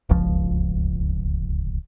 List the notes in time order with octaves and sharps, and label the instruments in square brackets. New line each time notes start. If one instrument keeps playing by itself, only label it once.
[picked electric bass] D1 G1 C#2 F3